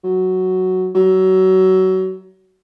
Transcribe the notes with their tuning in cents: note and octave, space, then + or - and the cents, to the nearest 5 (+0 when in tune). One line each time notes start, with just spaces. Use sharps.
F#3 +5
F#3 +25